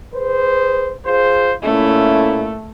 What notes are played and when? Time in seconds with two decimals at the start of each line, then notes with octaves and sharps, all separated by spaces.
0.15 G#4 B4 C5
1.06 F4 G#4 C5
1.63 A#2 A3 C#4 E4